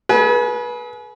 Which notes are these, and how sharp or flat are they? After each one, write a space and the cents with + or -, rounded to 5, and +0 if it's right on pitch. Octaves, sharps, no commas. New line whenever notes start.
G#4 +35 B4 -30 G#5 +35